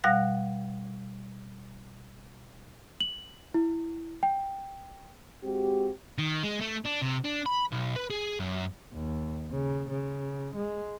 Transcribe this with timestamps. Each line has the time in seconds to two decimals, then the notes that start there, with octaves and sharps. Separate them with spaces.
0.04 B2 G3 F5 F#5 F#6 A#6
3.01 F#7
3.54 E4
4.23 G5
5.43 G#3 C4 F#4 G4
6.18 D#3
6.44 G#3
6.61 A3
6.86 D4
7.02 C3
7.25 D4
7.46 B5
7.72 B1
7.96 B4
8.10 G#4
8.40 F#2
8.93 D#2
9.52 C#3
9.91 C#3
10.55 G#3